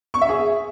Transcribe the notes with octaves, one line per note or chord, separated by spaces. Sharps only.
C#6
E5
G#4